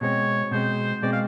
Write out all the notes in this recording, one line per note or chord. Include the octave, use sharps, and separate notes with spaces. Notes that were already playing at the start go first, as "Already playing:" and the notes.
B2 G#3 C4 C#5
B2 G#3 C4 C5
B2 G#3 C4 D5
F5